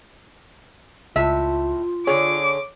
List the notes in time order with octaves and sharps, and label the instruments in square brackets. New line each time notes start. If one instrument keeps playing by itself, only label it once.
[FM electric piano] C#2 [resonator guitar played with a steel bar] A2 E5 [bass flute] F4
[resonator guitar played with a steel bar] D3 G#4 [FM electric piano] C#5 [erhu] D6